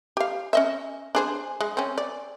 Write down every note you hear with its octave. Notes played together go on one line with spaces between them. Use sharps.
G4 F5
C#4 D#5 E5
D4 G#4 C5
G#3
C4 C#4
D5